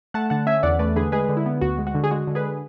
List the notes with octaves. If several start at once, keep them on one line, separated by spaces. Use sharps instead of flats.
A3 F#5 A5
D3 F#5 A5
C#4 E5 G#5
E2 D5 F#5
A3 B4 D5
D3 G#4 B4
G#3 G#4 B4
D3
E4
B3
D2 F#4
G#3
F#4
D3
G#4
G#3 F#4
D3
G#4 B4